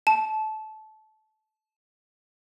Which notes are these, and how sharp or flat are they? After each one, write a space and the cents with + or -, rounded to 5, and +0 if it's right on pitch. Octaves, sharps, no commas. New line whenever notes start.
A5 -20